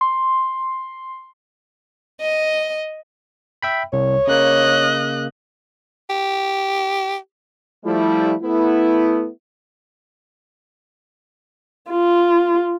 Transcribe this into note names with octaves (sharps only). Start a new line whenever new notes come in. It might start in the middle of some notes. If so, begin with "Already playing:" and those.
C6
D#5
E5 G5 B5
C2 C#5
C#3 A#3 D#5 F#6
G4
F3 G3 A3 E4
A3 B3 E4
F4